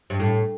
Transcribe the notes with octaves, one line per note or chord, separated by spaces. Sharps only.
G2
A2